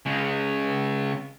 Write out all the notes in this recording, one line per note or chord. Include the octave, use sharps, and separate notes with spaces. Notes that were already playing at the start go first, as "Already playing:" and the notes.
C#3 G#3